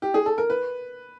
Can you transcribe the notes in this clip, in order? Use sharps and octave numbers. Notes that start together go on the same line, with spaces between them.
G4
G#4
A4
A#4
B4